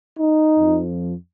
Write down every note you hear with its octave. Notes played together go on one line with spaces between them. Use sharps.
D#4
F2 F3